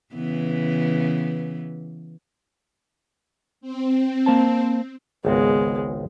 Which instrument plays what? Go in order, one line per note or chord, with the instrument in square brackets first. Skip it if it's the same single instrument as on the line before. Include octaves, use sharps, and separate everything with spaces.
[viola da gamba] C#3 E3 B3
[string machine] C4
[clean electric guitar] A#3 C5 A5
[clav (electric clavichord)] G#1 C#2 F#4 [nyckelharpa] G#3 B3